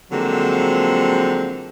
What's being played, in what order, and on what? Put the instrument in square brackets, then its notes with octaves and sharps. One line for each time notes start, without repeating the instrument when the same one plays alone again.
[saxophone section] D3 F3 F#3 G#3 A#3 C4